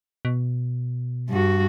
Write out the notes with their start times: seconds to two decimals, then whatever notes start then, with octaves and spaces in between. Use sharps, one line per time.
0.25 B2
1.29 G2 F#4